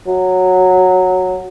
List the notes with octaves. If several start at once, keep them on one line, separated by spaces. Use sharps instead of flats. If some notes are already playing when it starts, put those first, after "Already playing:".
F#3